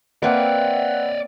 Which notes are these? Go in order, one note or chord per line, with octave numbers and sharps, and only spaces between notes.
A#3 C4 B4 C#5 D5 E5 F#5